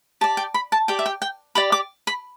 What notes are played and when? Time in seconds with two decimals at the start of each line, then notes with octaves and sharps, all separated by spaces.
0.21 G4 D5 A5
0.37 G5
0.54 B5
0.72 A5
0.88 G4 D5 G5
0.99 E5
1.06 G5
1.22 G5
1.55 G4 D5 B5
1.72 D6
2.07 B5